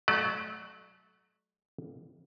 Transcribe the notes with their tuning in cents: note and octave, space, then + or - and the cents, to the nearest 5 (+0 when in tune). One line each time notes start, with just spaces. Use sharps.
F#3 +0 A3 -30 D5 +30